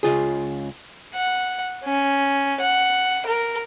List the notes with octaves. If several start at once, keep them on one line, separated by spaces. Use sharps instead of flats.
C#2 F4 G#4
F#5
C#4
F#5
A#4